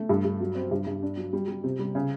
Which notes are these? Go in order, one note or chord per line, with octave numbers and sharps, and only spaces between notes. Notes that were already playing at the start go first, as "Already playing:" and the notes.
Already playing: A3
G2
G2
F#3
C4
G2
G2
D4
F#3
G3
G3
C3
G3
C#3